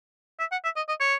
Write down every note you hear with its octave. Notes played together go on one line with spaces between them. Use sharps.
E5
F#5
E5
D#5
D#5
C#5